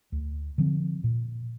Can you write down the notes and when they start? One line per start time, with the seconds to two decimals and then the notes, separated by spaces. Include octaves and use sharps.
0.12 D2
0.58 D3 F3 C4
1.04 A#2